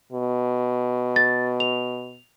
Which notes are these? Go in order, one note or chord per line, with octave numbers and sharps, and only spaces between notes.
B2
A6
F7